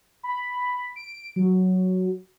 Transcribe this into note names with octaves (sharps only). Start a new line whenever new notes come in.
B5
D7
F#3